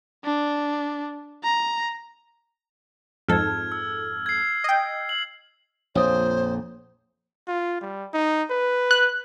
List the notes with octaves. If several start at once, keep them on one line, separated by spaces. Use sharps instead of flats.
D4
A#5
F2 G#2 A4 F6 G#6
E6
G#6 C7
D#5 G5
F#7
A#1 F2 C5 C#5 D#6
F4
G3
D#4
B4
F#6